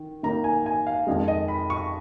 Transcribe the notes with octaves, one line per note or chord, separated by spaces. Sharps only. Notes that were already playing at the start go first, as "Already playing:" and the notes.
Already playing: D#3
D#3 A#3 D#4 A#5
G#5
G#5
F5
F2 D#3 G#3 D#5
D#5
B5
C#6